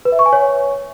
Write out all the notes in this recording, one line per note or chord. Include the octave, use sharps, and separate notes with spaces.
B4
E5
C#6
G#5
C#5